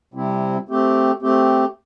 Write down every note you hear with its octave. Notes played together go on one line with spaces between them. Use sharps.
C3 G3 C4 E4
A3 C4 G4
A3 C4 G4